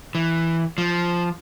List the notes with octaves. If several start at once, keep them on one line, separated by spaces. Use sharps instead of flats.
E3
F3